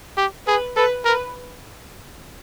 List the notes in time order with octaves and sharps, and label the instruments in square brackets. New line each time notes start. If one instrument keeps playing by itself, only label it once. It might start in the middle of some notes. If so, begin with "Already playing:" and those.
[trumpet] G4
[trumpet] G#4 [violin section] B4
[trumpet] A4 [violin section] B4
[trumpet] A#4 [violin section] B4